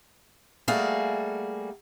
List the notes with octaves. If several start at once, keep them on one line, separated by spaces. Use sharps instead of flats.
G3 A3 A#3 F#4 G#4 F5